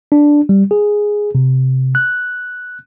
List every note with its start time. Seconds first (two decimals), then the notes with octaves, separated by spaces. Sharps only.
0.12 D4
0.49 G3
0.71 G#4
1.35 C3
1.95 F#6